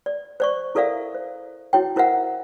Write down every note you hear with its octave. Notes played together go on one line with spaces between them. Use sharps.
D5
C5 D5 C#6
E4 A4 A#4 D5 E5 F5
C5
E4 F#4 C#5 G5
E4 A#4 C5 E5 F#5